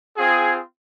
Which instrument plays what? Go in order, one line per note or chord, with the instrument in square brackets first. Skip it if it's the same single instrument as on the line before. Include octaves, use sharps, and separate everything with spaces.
[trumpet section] C4 F4 G#4